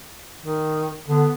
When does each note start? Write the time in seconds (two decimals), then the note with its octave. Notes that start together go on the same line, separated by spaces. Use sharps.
0.40 D#3
1.08 D3 B3